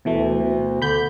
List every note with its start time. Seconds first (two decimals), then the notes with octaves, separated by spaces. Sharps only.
0.05 D2 B2 E3 A3
0.40 B2
0.82 D3 B5 G6